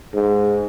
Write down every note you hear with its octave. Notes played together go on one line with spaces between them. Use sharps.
G#2